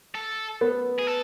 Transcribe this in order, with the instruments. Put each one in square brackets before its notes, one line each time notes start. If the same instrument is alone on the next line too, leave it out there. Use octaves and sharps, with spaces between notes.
[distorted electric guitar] A4
[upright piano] B3
[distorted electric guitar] G#4
A4